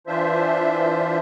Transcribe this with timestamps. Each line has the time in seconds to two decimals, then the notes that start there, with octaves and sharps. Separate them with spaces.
0.07 E3 D4 F4 C5 E5